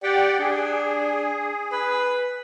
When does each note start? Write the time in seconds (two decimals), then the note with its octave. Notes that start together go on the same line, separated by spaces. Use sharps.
0.03 G4 D5 F#5 G5
0.39 D4 G#4
1.72 B4